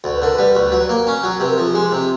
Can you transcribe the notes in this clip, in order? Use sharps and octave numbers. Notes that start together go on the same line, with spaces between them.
D2
B4
D3 A#4
B4
G3
D2
F#3
A#3
C#4
F#3
C3 B4
A#4
F3 A4
G#4
G#3 G4
C3